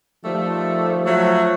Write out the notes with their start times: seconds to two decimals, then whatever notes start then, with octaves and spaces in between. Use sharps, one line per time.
0.24 D#3 F3 G3 A3
1.05 F#3 A3